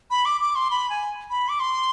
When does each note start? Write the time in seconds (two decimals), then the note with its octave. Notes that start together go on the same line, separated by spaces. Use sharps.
0.11 B5
0.25 D6
0.41 D6
0.55 C6
0.71 B5
0.90 G#5
1.30 B5
1.49 D6
1.60 C6